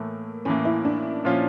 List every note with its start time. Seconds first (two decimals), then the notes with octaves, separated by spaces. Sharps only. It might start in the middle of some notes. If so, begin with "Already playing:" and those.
Already playing: A2 E3 A3 A#3
0.45 A2 E3 A#3 C#4
0.65 E4
0.85 D4
1.25 A#2 F3 C#4 F4